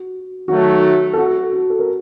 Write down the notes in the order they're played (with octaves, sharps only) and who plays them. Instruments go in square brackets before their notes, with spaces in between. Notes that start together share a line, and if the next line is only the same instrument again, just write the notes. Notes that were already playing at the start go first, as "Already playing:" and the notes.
Already playing: [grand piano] F#4
[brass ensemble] D#3 F#3 A3 [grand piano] F#4
[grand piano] A4
F#4
F#4
A4
A#4